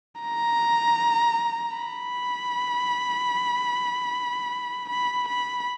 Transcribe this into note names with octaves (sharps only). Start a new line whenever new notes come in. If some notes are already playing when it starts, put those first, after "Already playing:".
A#5
B5
B5
B5